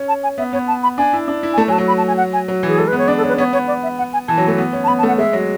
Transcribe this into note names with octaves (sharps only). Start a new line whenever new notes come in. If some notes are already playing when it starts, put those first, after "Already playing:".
Already playing: C#4
A5
G#5
B3 E5
B3 C#5
A5
B5
D4 G#5
E4
D4
E4
G#5
A3 A5
F#3 G#5
A5
F#3
B5
A5
G#5
F#5
G#5
F#3
E3
G#4
G#3 A4
B3 B4
C#5
D4 D5
A4
C#4
B4
B3 C#5
B3 C#5
D5
E5
F#5
G#5
E3 A5
F#3
A3
B3
C#4
A5
B3 B5
A5
A3 F#5
G#3 E5
F#3